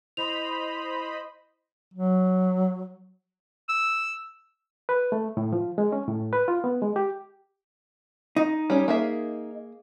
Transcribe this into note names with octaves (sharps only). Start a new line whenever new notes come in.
E4 C5 D#5 B5 F7
F#3
E6
B4
A3
A2
F3
G#3
C#4
A2
B4
F4
B3
G#3
G4
D#4
G3 C#4
A#3 G#4 E5